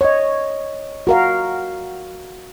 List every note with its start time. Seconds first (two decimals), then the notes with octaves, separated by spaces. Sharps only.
0.01 C#5 D#5
1.07 F#4 A#4 F5